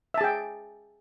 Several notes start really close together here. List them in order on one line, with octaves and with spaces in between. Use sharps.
E5 A5 G#4 G5